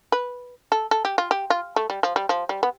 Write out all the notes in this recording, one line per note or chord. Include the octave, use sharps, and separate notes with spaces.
B4
A4
A4
G4
F4
G4
F4
A3
G3
F3
G3
F3
G3
B3